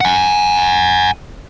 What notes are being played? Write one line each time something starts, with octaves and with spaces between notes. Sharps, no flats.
F#5 G#5